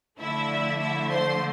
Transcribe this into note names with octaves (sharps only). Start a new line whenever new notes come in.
D3 F3 A3 E4 E5
E4 E5
C5 C6